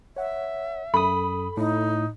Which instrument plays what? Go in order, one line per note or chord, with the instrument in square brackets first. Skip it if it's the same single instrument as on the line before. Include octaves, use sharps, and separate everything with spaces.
[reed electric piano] C#5 F#5 [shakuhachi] E5
[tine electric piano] F#2 D#6 [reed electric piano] A4 [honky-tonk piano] B5
[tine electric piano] A2 [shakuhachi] D#4